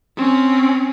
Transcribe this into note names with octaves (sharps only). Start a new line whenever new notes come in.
C4 C#4